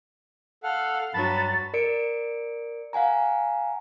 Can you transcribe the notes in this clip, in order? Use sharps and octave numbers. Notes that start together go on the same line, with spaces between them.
A4 F5 F#5 F6
G2 F#3 A5 B5 A6
A#4 D5 C#7 D7
F5 F#5 G#5 A#5